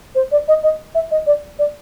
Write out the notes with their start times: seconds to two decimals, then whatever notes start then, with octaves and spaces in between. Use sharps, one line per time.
0.15 C5
0.32 D5
0.48 D#5
0.63 D#5
0.95 E5
1.11 D#5
1.27 D5
1.59 D5